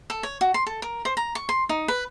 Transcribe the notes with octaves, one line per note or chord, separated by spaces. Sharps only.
A4
C#5
F#4
C6
A4
A#4
C5
A#5
C#6
C6
D#4
B4